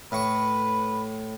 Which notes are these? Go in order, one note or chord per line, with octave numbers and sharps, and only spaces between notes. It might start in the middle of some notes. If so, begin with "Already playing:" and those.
A2 B4 C#6